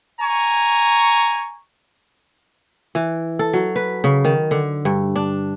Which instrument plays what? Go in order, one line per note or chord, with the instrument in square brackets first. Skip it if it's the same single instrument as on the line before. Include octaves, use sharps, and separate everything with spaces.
[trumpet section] G#5 A#5 C#6
[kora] E3
A4
F#3
B4
C#3
D#3
D3
G2
D4